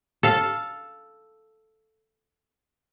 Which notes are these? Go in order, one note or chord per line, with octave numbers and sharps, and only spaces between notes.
A4 F5